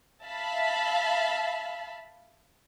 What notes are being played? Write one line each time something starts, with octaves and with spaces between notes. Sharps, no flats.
E5 F5 A5 B5